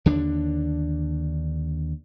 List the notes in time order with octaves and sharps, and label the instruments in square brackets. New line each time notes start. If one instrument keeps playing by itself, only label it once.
[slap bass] D#2 D3 D4